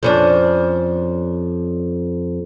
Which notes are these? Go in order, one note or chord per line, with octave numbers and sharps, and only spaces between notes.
F2 C#4 D4